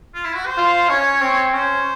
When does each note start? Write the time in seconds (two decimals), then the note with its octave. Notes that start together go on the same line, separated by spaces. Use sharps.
0.15 F4
0.25 E4
0.36 F#4
0.46 C5
0.57 F4
0.89 C#4 C#5
1.21 C4
1.53 C#4 C5